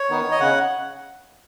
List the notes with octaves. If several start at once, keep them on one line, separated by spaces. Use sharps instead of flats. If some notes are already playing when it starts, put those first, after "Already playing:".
Already playing: C#5
D#3 B3 D#4
D#5
C#3 F#5